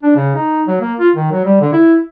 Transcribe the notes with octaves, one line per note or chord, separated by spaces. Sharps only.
D4
C#3
D#4
F#3
A#3
F4
D#3
F#3
G3
D3
E4